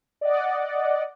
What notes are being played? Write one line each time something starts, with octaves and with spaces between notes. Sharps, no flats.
D5 D#5 F#5